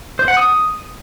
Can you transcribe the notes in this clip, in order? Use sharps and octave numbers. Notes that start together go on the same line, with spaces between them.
C5
F#5
D#6